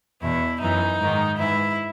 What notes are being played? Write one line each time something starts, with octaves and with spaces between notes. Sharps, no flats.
E2 B2 E4
F#2 E3 D#4
G#2 D#3
G#2 E3 E4